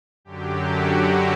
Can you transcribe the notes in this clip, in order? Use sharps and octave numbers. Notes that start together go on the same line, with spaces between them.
F#2 D3 F#3 G4
F#4
G4